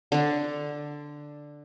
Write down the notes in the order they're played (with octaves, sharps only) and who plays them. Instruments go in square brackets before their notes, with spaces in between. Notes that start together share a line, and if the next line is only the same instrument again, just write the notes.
[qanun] D3 D4